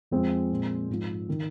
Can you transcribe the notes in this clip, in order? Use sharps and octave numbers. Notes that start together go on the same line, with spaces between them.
F2 F3 G#3 C4
A#2 F3
G#2 F3
D#3